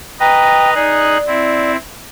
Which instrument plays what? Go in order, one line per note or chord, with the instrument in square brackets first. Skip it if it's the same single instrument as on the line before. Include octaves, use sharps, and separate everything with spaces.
[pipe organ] B4 D#5 A#5 [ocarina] G5
[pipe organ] D#4 G#4 F#6 [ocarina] D5
[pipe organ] C4 E4